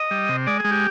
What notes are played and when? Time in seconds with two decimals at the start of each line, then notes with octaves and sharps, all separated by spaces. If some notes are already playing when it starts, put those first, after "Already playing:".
Already playing: D#5
0.11 G3
0.29 C3
0.47 G#3 D5
0.60 G#3 G#4
0.71 G4